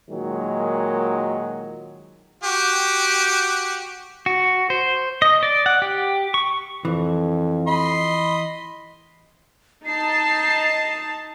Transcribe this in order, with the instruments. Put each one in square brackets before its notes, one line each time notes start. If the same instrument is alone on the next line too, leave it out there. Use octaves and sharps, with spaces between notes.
[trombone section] A#2 D#3 F#3 G#3
[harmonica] F#4 G4
[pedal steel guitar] F#4
C5
D#5
D5
F#5
G4
C#6
[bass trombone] F2 [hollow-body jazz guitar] E3
[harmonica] D#5 B5 C6
[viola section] D#4 A5 [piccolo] C7